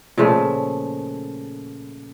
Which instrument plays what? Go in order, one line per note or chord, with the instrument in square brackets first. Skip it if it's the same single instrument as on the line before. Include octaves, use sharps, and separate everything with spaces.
[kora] A#2 C#3 F3 A3